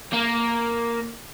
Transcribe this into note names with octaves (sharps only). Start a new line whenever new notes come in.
A#3